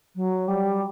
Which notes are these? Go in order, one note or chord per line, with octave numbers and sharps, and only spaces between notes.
F#3
G3